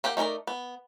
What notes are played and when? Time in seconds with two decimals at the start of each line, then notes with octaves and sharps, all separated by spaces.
0.04 A#3 G4 F#5 G5
0.17 A3 D#4 E4 A#4 D5
0.47 B3